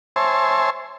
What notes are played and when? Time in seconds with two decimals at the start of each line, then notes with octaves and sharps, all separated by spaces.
0.16 C5 C#5 E5 G#5 A5 C6